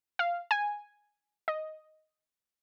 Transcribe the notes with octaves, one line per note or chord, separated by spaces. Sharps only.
F5
G#5
D#5